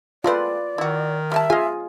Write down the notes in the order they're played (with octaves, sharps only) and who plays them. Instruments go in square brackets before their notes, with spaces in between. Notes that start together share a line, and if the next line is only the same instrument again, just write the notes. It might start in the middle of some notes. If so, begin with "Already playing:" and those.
[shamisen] G#3 A3 C4 [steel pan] F4 B4 [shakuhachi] D5
[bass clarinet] D#3 [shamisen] E4 F#4
[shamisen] G3 G#5 A5 [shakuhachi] E5
[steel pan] F4 G#4 F5 [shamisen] D#5 G#5